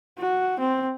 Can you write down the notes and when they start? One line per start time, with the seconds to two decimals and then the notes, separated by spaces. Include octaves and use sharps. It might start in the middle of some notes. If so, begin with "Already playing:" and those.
0.19 F#4
0.60 C4